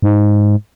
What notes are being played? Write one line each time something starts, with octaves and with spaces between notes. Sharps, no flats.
G#2